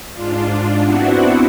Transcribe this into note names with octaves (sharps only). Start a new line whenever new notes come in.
G#2 D4 F4
B3 C4 D4 E4 F#4 F#5